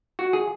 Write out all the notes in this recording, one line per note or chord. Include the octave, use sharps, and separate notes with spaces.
F#4
G#4